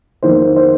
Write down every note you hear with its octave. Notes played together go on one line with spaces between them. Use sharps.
F2 D#3 A#3 C5
C5